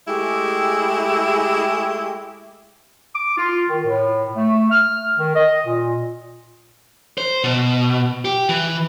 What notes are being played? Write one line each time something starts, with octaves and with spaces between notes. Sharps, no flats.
G#3 A3 E4 G4 G#4
D6
F4
D#3
A2
A3
F6
D#3
D#5
A#2
C5
B2
G4
E3